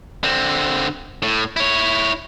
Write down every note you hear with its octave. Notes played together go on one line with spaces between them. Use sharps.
D3 C4
A2
E4 C#5